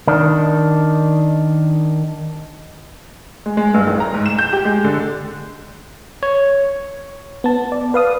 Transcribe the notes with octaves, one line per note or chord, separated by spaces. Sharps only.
D#3 D4
G#3
G#3
G2
A1
A#5
G#2
E7
G6
G4
G#3
D3
C#5
B3 A5
D5
B4 F5 D#6